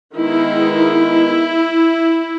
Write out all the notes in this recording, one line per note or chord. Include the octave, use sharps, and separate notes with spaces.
D#3 G#3 B3 D#4 E4